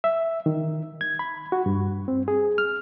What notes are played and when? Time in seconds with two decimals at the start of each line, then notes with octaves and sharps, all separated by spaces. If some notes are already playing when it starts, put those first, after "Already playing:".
0.04 E5
0.46 D#3
1.01 G#6
1.19 B5
1.52 F#4
1.66 G2
2.08 C4
2.28 G#4
2.58 F6